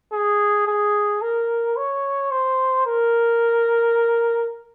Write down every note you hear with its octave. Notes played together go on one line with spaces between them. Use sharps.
G#4
G#4
A#4
C#5
C5
A#4